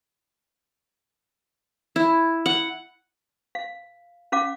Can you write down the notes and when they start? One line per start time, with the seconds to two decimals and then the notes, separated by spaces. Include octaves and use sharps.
1.96 E4
2.46 F#5
3.55 F5
4.32 C#4 F5 D6